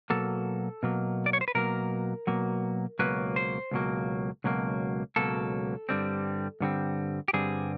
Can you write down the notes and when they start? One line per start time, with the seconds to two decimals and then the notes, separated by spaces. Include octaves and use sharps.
0.10 B2 F#3 A#3 A4
0.83 B2 F#3 A#3
1.26 D5
1.33 C#5
1.41 C5
1.48 B4
1.55 B2 F#3 A#3 A#4
2.27 B2 F#3 A#3
2.99 C#2 B2 F#3 A#3 B4
3.36 C5
3.71 C#2 B2 F#3 A#3
4.44 C#2 B2 F#3 A#3
5.16 C#2 B2 F#3 A#3 A4
5.89 G2 D3 G3 C4
6.60 G2 D3 G3 C4
7.28 G4
7.33 G2 D3 G3 C4 G#4